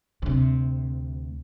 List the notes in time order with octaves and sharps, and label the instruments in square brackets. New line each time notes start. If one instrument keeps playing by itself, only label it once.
[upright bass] D2 C3